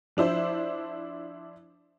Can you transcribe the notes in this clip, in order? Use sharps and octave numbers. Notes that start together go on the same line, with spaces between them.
F3 D4 E4 C5